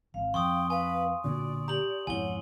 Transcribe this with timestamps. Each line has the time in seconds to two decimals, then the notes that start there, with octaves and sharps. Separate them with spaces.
0.14 G#1 F5
0.34 F2 G5 C6 C#6 D#6
0.70 B4 F5 G#5
1.24 B1 A#2 D3 F#4 D5
1.68 G4 A#5 F#7
2.07 B1 F2 G#2 E4 C#5 F#5 G#5 G7